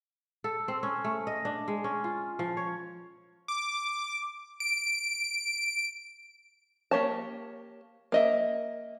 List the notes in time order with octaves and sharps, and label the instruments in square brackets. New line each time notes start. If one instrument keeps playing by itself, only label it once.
[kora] A4
C4
C#4
A3
D#5
D4
G#3
C#4
F4
F3
C#5
[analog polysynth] D6
D7
[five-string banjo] A#3 G4 C#5 A5
A#3 D#5 E5